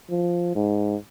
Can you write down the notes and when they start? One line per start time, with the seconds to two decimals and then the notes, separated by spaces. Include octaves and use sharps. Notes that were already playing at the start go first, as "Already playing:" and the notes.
0.10 F3
0.55 G#2